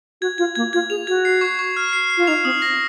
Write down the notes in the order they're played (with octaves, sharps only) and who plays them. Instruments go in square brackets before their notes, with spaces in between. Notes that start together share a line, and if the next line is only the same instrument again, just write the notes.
[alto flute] F#4 [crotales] G#6
[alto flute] F4 [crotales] G#6
[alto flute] A#3 [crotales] G#6
[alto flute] F4 [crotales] G#6
[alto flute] G#4 [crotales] F7
[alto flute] F#4 [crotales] G#6
[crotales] C7
C#6
C#6
F6
C7
C7
[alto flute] F4
[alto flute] D#4 [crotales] F7
[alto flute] C4 [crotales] D#6
[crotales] A#6